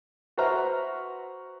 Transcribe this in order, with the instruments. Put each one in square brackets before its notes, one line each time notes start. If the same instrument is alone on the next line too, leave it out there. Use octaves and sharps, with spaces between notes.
[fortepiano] F#4 B4 C5 E5 A#5 F6